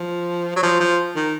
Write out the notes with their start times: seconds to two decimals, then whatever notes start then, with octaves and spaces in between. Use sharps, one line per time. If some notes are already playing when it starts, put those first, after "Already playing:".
Already playing: F3
0.56 F#3
0.63 F3
0.80 F3
1.15 D#3